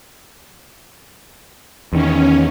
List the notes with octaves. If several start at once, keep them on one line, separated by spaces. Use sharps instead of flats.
E2 D#3 C#4